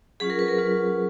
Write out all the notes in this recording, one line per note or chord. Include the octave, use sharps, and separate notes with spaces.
F#3 C#4 F4 G#4
A#4
B4
A#4
F#3 C#4 F4